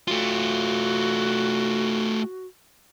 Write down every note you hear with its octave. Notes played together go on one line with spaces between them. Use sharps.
A3 F4 F#4